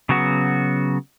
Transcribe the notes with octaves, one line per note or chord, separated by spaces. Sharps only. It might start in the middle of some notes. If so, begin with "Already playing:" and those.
C#3 F#3 B3 F#4